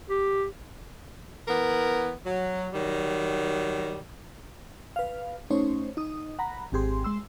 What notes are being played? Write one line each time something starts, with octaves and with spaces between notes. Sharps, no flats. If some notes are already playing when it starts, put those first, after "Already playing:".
G4
E3 B3 A#4
F#3
D#3 F#3 G3
B4 F5
A3 C#4 D#4 C5 C#5
D#4 D#6
F#5 A#5 B5
G#1 C4 G4 G#4 C6
G#3 C6 E6